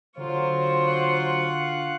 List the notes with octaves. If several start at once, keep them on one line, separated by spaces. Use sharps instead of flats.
D3 F#3 F4 C5 C#6
F5 F#5 F#6